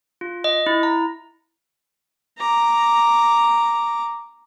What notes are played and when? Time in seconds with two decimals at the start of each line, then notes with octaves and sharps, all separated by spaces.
0.21 F4
0.44 D#5
0.66 E4
0.83 A#5
2.38 A#5 D6